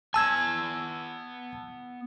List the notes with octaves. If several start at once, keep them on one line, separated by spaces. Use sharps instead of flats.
B3 G#5 A5 E6 G#6